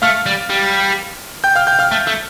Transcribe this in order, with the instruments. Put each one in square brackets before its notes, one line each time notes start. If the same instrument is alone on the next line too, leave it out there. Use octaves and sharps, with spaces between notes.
[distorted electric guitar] A3 [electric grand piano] F5 F6
[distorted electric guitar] G3
G3
[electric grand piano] G5 G6
F5 F6
G5 G6
F5 F6
[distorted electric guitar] A3
A3